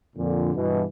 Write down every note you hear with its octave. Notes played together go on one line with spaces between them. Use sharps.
F2 A#2 D3
G2 B2 E3